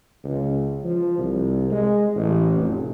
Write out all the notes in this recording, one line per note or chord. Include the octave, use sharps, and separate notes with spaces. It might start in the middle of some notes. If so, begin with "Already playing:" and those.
C#2
F3
C2
G#3
A1
F1